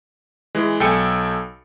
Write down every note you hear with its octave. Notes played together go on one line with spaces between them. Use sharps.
E3 G#3
B1 A4 G5 G#5 C#7